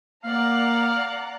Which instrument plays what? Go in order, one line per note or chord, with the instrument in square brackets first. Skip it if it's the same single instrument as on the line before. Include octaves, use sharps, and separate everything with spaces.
[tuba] A#3 [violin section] D5 F#5 A#5 [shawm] F5